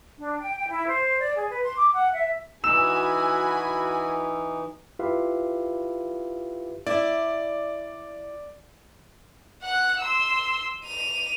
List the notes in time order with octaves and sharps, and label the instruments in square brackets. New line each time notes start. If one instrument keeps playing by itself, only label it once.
[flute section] D4
G5
G5
E4
C5
D5
G#4
B4
C6
D6
F#5
E5
[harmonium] E3 D#4 [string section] F#4 G#5 B5 [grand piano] E6 E7
[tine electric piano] E4 F4 G4 B4 E5 F5
[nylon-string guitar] E4 [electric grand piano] D5
[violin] F#5 F#6
C6 E6
D#7 F7